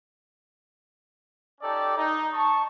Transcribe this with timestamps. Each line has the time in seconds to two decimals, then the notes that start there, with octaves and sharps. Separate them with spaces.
1.61 C#4 D#4 G4 A4 D5
1.97 D#4
2.33 A5 C#6